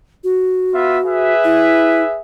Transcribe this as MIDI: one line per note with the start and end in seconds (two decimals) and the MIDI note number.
0.24 1.33 66
0.74 1.00 59
0.74 1.00 65
0.74 1.00 76
1.05 2.21 68
1.05 2.21 71
1.05 2.21 76
1.44 2.03 64